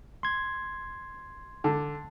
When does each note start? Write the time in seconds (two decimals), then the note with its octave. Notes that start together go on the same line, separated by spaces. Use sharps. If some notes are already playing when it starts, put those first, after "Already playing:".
0.23 C6 G#6
1.64 D3